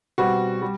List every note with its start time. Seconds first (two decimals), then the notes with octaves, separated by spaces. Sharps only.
0.18 B2 G3 C4 F#4
0.62 G3